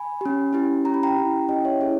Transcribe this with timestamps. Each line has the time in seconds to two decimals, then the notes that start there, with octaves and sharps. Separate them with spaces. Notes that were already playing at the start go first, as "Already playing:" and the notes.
Already playing: G#5 B5
0.21 C#4 G4
0.53 C#4 E4 G4
0.85 C#4 E4 G4 A#5
0.94 B5
1.03 G5 A#5
1.17 C#4 E4 G4
1.48 C#4 E4 G4 D#5 G5
1.65 C#5 E5
1.81 C#4 E4 G#4